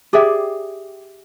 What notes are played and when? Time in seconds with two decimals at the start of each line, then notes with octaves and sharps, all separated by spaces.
0.13 G4 G#4 D5 E5